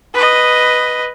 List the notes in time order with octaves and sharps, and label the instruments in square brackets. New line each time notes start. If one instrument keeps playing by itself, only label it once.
[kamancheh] B4 D#5